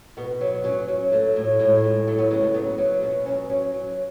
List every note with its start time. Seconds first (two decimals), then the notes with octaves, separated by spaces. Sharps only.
0.17 B2 B3
0.41 F#3
0.64 F#3 C#4
0.88 F#3
1.12 F#3 A3
1.36 A2
1.59 A2 G#3
1.76 G#3
1.84 A2
2.07 F#3 A3
2.19 B3
2.31 C#3 G#3
2.43 A3
2.54 F#3 B3
2.78 F#3
3.02 B2 C#4
3.26 F#3 C#4
3.50 F#3 C#4
3.74 F#3